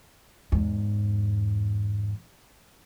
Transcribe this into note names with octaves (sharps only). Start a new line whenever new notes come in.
E2 G#2